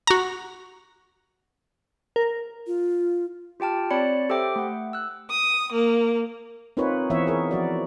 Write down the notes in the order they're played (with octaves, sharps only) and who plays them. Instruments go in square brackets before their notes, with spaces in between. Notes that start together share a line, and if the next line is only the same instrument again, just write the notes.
[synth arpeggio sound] F#4 A#5
[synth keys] A#4
[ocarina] F4
[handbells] F4 G4 G5 A5 F6
C4 C#5 D5 B5 C#7
G4 A4 C5 E5 G5 D6
A3 F#5
E6 F#6
[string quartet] D#6
A#3
[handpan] C4 D#4 F4 A#4 B4 C#5
E3 B3 E4 C5 C#5 E5
G#4 A#4
F3 F#4 D5